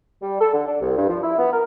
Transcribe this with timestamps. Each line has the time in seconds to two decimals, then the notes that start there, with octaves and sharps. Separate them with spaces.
0.21 G3
0.40 A4
0.53 D3
0.67 D4
0.81 C2
0.97 G2
1.09 F3
1.23 E4
1.38 B3
1.52 A#4